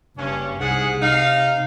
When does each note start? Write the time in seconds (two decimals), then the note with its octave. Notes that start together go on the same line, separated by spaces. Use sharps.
0.17 F#1 G2 C#4
0.59 C2 G#2 G#4 F#5
1.01 C3 D#4 F5